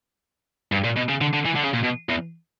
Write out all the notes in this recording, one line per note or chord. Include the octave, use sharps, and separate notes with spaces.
G2
A#2
B2
C#3
D3
D3
E3
D3
C#3
A#2
B2
E2